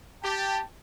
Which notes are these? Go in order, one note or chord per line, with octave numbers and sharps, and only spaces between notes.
G4 G5 A5